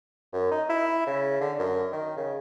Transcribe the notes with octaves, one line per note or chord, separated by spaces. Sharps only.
F#2
D#4
E4
C#3
D3
F#2
D#3
C#3